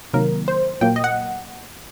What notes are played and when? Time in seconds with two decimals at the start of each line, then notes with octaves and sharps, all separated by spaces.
0.14 C3 D#3 F#3 A#3 A#4
0.48 C5
0.81 A#2 F#3 A#3 G5
0.96 D#5
1.04 F#5